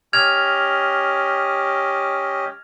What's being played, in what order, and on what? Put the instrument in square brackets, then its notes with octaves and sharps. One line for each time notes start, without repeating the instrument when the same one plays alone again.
[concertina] C#4 G4 D#5 [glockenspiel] F6 G#6 F7